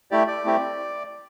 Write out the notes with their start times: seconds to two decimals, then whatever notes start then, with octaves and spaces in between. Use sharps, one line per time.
0.11 A3 E4 G4 D5
0.27 D5
0.44 A3 C4 E4 G4